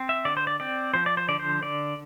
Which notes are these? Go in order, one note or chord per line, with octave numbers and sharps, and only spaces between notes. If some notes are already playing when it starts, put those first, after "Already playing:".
Already playing: C4
E5
D3 D5
C5
D5
C4 D5
F3 C5
D5
C5
D3 D5
C5
D3 D5